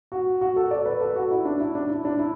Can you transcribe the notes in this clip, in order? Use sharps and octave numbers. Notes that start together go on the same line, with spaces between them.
F#4
F#4
A4
D5
B4
A4
F#4
E4
D4
E4
D4
E4
D4
E4